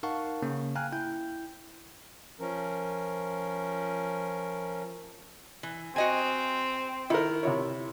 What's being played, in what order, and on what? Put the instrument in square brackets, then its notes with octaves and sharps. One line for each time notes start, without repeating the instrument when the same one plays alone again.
[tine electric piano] D#4 A#4 F5 F#5 A5 C#6
C#3 A#3 C#4
F5 G5 G#5 A#5 F6 F#6
E4 G5 G6
[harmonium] F3 C#4 A#4
[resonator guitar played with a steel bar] E3
[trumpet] C4 [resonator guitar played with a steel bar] F#4 D#5 G#5
[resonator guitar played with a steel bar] D#3 [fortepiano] E4 A#4
[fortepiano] C3 E4 C#5